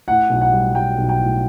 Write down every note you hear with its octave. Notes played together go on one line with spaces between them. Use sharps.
A2 F#5
B1
F#5
G3
G3 G5
B1
G5
A2